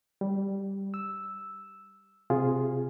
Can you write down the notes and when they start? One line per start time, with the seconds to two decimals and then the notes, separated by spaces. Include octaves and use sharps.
0.21 G3
0.94 E6
2.30 C3 F4 G#4